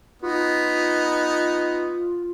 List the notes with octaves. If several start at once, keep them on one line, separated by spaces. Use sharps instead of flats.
B3 D#4 F4